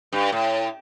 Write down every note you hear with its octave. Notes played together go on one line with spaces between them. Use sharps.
G2
A2